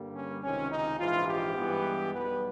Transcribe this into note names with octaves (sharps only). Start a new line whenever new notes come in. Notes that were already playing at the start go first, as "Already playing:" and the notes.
Already playing: G2 D3 G3 A#3
C#4
C#2 C3 D#3 C#4
D#4
A#1 G#2 E3 F4
G4
G2 E3 G#3 B3
B1 B2 G3 B3 B4